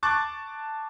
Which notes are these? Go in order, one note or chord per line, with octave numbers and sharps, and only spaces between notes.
A5 C#6 D6 F#6 A6